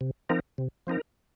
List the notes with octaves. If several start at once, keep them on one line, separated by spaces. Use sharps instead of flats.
C3
F3 C4 D#4 A#4
C3
F3 C4 D#4 A#4